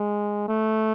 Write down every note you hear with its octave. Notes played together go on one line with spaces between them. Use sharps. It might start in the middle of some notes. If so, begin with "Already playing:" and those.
Already playing: G#3
A3